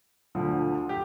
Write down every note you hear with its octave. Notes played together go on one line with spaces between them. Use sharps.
D2 D3 F3
G4